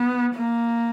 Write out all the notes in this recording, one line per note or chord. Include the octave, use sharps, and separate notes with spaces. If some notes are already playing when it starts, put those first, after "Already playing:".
Already playing: B3
A#3